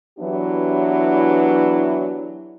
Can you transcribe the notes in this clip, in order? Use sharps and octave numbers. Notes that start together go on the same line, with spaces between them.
E3 F#3 B3 D4 E4 G4